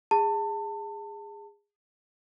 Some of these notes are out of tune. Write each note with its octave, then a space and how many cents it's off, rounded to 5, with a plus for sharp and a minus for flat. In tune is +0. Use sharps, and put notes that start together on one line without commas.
G#4 -20 A5 +25